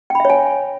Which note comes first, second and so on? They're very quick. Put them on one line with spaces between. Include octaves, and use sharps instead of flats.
G5 B5 E5 C#5 G#5